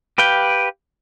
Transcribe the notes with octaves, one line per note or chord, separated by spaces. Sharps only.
G4 B4 F5 G5